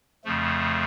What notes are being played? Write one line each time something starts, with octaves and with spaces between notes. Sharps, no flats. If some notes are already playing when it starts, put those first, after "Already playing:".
F2 C#3 F3 A3